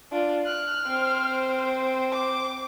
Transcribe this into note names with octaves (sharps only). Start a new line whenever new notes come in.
D4 F4
F6 F#6
C4 C5
D6